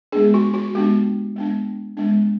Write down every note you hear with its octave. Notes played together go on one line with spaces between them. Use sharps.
G#3 B3 D4 G#4
F#4
F#4
G#3 B3 D4 G4
G#3 B3 D4
G#3 B3 D4